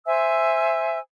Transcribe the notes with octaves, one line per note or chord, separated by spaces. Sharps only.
C5 E5 G#5 E6